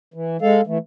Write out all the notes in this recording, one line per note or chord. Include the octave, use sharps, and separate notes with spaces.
E3
G#3 A4 F5
E3 A3